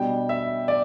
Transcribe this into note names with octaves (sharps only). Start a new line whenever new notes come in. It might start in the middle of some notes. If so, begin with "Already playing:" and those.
Already playing: B2 G3 D4 G5
E5
D5